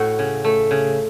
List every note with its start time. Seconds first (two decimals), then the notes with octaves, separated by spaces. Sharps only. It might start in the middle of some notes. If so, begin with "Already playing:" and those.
Already playing: A2 A3 F#4
0.19 C#3
0.44 A3
0.71 C#3